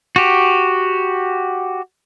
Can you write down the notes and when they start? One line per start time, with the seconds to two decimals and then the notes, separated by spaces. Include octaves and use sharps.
0.16 F#4 G4